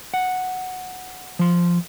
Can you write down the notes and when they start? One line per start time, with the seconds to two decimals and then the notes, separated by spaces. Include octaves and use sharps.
0.14 F#5
1.39 F3 C6